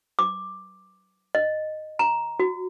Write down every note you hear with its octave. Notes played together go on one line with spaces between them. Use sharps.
D6
D#5
A#5
F#4